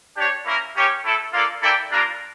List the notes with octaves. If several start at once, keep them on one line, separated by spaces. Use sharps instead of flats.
D4 G4 C#5
A#3 C#4 E4 A#4
A#3 C#4 G4 C#5
A3 E4 A4
A#3 D4 F4 A4 D5
A#3 E4 A4 D5 G5
G3 A#3 D4 F4 A#4